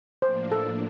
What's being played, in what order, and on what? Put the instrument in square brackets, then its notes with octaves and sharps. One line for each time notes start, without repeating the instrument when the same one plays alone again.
[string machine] A2 F3 A#3 D4 [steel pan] C5
[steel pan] A4